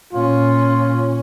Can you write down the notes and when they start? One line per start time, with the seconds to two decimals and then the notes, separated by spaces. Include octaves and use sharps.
0.13 A#2 C#4 F4